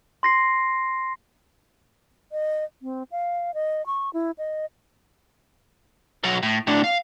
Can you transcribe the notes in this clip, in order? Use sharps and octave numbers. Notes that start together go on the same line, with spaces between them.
C6 A#6 C7
D#5
C4
F5
D#5
C#6
E4
D#5
B2 F#3
A2
A2 D4
F5